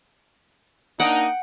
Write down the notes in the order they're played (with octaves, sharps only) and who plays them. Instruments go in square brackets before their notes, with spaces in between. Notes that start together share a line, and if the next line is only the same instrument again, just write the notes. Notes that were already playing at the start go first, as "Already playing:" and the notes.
[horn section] A#3 D4 D#4 [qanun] F#5 G5